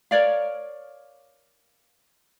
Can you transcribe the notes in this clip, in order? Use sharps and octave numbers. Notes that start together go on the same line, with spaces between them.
A#4 C#5 D5 F5